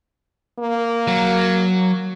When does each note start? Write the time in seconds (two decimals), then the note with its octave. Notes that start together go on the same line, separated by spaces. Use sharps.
0.59 A#3
1.07 F#3